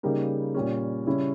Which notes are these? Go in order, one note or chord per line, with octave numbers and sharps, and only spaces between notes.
C#3 G3 A#3 D#4
A#2 G3 C#4
C#3 G3 C#4 E4